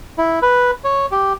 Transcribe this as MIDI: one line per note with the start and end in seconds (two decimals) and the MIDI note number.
0.18 0.39 64
0.42 0.71 71
0.84 1.06 73
1.12 1.33 67